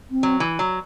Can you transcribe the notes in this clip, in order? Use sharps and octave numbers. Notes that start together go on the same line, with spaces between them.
C4
F#3
E3
F#3